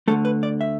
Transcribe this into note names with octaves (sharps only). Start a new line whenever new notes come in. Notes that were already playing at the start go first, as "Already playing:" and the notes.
D2 D3 A3 A4
B4
D5
E5